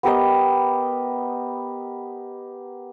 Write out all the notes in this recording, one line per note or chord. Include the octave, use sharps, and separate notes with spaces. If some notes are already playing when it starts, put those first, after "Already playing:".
B3 G4 A#4 D#5